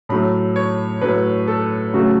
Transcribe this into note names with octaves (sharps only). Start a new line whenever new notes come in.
A2 F#3 A3 B5
C#5
A2 F#3 A3 B4
A4
C#3 F#3 A3 F#4